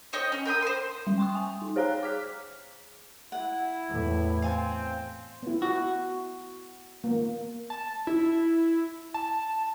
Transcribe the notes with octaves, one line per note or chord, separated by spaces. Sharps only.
C5 C#5 D#5 G5
C#4
A#4 G5 B5 D#6
C5 C6
G3
G5 C6 C#6 D#6
G#5
D#4
G#4 C5 C#5 F5 A#5 F#6
D6 F6 B6
E4 F#5
E2 A2
C4 F5 G#5 A5
B3 E4
F#4
A#3 B3
A5
E4
A5